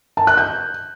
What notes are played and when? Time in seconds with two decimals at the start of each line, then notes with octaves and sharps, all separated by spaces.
0.17 A5
0.27 F#6
0.37 G6